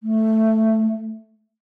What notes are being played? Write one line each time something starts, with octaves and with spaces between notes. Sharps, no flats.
A3